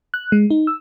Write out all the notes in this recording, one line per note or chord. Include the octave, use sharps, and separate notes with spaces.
F#6
G#3
D#4
E6